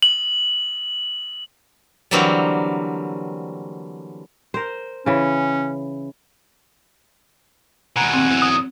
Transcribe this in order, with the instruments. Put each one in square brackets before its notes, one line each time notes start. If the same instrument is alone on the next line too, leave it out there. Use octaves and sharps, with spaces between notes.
[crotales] F#7
[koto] D3 E3 F#3 G3 A#3 C4
[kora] A#4 C5
[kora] C#3 E3 [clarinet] C#4
[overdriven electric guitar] D#2 B2 [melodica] F#5 G#5 [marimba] A#5
[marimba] C4
[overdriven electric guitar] E2 F#3
[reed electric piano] D#6